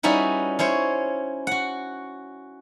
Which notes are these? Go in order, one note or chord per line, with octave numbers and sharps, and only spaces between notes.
G3 C#4 D#4 E4 F#4 B4
C#4 E4 C5 C#5
F#4 F#5